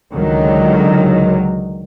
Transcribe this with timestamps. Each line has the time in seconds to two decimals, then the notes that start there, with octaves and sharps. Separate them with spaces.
0.13 C#2 D3 D#3 F#3